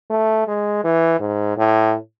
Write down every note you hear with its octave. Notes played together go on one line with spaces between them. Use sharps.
A3
G#3
E3
G#2
A2